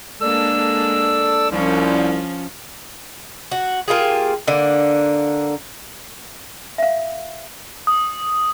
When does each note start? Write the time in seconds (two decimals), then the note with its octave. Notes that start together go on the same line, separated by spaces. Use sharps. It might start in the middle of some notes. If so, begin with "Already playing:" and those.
0.21 G#3 A#3 D4 A4 D5 E6
1.50 C2 F3 C#4
3.52 F#4
3.88 A#3 F4 G4 G#4
4.48 D3 A#3
6.78 E5 F5
7.87 D#6